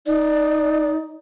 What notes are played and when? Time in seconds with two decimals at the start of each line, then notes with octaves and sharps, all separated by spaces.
0.06 D#4 D5